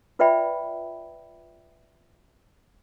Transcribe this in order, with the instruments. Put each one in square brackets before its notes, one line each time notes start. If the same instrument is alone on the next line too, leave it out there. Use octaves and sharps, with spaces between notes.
[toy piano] F4 B4 D5 E5 G5 B5